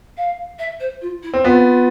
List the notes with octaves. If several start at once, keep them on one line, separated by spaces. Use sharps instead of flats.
F5
E5
C5
F4
E4
C4
B3 F4